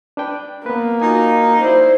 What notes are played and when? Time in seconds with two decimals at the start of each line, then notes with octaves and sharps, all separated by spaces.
0.17 D4 B4 G5
0.66 A#3 B3 B4
1.02 D#4 F4 F#4 G#5
1.63 E4 C5 D5